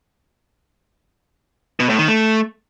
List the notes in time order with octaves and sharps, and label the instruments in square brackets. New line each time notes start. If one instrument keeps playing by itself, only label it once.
[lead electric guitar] B2
A2
D#3
A3